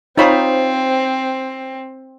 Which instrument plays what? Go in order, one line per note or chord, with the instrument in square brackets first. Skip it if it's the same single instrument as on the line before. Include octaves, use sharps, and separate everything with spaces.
[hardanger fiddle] C4 [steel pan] D#4 C#5 B5 [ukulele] F4 C5 A#5